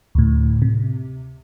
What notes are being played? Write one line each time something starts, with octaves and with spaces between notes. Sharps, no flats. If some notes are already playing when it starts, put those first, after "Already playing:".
D2 A2
C3